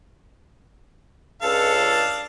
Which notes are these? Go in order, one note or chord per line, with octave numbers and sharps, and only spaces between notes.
C#2 D4 A4 F5 A5